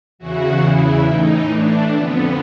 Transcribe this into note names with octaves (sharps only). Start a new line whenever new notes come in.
E2 C#3 E3 F#4
E4
A2 E3 D#4
D4
F2 D3 B3